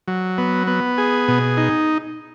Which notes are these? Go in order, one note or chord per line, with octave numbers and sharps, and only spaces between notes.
F#3
B3
B3
G#4
B2
D#4